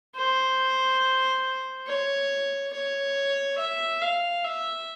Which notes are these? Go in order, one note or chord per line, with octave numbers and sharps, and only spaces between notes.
C5
C#5
C#5
E5
F5
E5